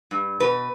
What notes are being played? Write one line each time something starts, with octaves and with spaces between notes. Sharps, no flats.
G2
B2 B4